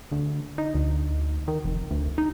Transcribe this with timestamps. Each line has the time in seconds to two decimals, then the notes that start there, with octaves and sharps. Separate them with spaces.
0.11 D2
0.58 D#4
0.74 D2
1.48 D#3
1.64 F1
1.91 D2
2.18 D#4